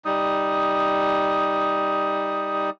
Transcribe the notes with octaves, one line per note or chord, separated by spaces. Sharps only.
G3 D#4 D#6